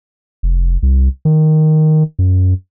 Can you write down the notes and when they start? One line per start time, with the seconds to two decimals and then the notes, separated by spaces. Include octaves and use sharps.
0.43 F1
0.83 C2
1.25 D#3
2.19 F#2